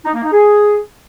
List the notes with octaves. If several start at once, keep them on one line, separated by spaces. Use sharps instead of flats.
D#4
A#3
D#4
G#4